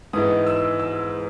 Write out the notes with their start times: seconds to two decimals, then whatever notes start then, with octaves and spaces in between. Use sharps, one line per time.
0.13 G#2 E3 B3 D#4 D#6
0.47 E6
0.79 E6